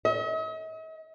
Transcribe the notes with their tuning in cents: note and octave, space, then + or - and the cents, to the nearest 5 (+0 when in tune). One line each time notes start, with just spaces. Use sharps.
D#5 +45